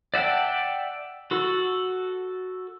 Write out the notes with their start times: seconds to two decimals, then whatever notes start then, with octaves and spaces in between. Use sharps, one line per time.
0.14 D5 E5 F#5 G5 A5
1.31 F#4 A4